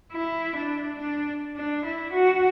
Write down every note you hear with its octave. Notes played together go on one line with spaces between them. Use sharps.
E4
D4
D4
D4
E4
F#4